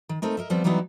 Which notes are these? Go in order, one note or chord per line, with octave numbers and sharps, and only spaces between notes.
D#3
A3 C4 D#4 A#4
A#4 D#5 E5
D#2 F3 G3 B3 C4
E3 F#3 G3 B3 D#4 E4